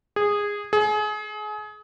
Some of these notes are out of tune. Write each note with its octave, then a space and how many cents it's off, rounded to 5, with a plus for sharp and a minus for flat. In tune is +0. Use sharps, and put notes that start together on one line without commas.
G#4 -15
G#4 +30